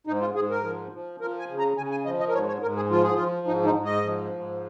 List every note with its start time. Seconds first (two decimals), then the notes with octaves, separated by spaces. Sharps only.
0.07 G#2 D#4
0.21 F4
0.35 G#2 G#4
0.50 A#4
0.63 F3
0.92 F3
1.20 F3 A#4
1.39 G#5
1.48 C#3
1.58 A#5
1.77 C#3 G#5
1.91 G#5
2.05 F3 D#5
2.20 D#5
2.28 A#4
2.33 G#2 C#5
2.48 C#5
2.62 G#2 A#4
2.76 G#4
2.90 F3 F4
3.02 G#4
3.15 F3 F4
3.47 G#2 D#4
3.65 D#4
3.75 G#2
3.85 D#5
4.04 F3
4.32 G#2